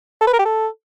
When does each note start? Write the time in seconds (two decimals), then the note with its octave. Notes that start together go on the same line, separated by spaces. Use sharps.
0.21 A4
0.27 B4
0.33 A#4
0.39 G4
0.45 A4